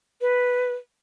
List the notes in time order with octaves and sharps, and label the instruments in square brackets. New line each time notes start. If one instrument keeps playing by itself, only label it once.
[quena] B4